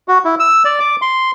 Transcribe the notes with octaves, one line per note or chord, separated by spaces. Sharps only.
F#4
E4
E6
D5
D6
C6